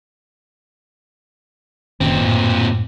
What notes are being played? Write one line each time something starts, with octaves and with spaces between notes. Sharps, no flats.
F#1 A#2 D#3 C4 C#4
F#2 A2